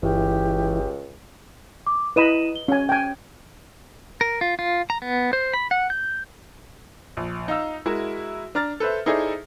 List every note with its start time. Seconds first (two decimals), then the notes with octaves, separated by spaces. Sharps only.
0.03 G1 C#2 E3 G4
1.87 D6
2.16 E4 B4 D#5 B5 D#7 E7
2.56 G7
2.68 C#4 G#5
2.89 G5 G#5
4.21 A#4
4.41 F4
4.59 F4
4.90 A#5
5.02 B3
5.33 C5
5.54 B5
5.71 F#5
5.90 G6
7.17 A#1
7.48 D#4 F5 E6
7.86 G#3 E4 F#4 A#4 E5
8.55 D4 A#5 F6 A6
8.80 A4 B4 C5 E5
9.06 D#4 E4 G#4 A4 C5 D5